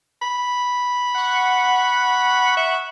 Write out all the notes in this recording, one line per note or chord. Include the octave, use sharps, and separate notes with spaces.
B5
F#5 C#6
E5